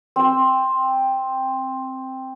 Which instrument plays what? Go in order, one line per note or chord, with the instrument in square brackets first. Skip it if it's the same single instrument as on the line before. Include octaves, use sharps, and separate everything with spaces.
[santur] C4 C5